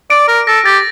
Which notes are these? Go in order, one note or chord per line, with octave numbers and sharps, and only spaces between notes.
D5 D7
A#4
A4 A#6
G4 A6